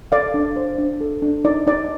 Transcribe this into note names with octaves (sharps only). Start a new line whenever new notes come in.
A4 D5 F5
D4
C5
D4
A4
D4
D#4 D5
D#4 D5